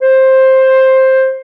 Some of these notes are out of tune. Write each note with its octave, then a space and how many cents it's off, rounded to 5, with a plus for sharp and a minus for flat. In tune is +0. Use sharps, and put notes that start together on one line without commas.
C5 +10